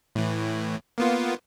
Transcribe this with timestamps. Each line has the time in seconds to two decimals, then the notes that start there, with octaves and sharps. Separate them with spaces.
0.15 A2 E3
0.98 A#3 B3 F4